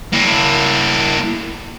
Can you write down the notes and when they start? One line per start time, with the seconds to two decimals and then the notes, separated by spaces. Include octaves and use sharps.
0.13 A#3 E4